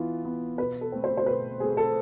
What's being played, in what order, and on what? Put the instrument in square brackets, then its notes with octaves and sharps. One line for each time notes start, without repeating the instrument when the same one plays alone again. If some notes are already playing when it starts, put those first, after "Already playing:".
Already playing: [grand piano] E3 B3 F4
B3 F4
[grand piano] B2 [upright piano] B4
[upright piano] A4
[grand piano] A3 C4
[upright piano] C5
C5
[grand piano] B2 [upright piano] B4
[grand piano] A3 C4 [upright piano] G#4
[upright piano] A4